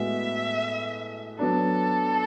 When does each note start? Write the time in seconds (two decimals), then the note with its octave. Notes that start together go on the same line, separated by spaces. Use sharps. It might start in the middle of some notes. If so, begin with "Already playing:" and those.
Already playing: A2 G#3 B3 F#4 E5
1.39 F#3 B3 D4 A4